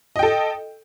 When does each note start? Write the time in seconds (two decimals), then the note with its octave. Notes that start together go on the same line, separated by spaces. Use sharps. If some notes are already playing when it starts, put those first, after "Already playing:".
0.16 D#5
0.19 G5
0.23 A4